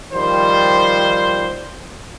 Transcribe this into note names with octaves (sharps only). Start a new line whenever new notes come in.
D#3 F3 G3 C5